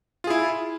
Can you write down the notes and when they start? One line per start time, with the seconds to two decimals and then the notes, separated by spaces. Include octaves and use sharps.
0.24 F4
0.27 G#4
0.30 E4